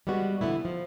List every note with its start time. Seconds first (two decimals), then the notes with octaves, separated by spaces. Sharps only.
0.07 G3 G#3 B3 F#4
0.41 D3 E3 F#3 A3 B3 E4
0.65 F3